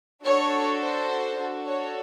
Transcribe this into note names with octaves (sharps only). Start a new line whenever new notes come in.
D4 F#4 A4 C#5
C5
D4 F#4 A4
C#5